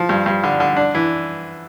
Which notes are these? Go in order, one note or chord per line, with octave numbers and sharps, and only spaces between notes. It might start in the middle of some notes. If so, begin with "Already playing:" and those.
Already playing: F3
G2
G2
D3
D3
D4
E3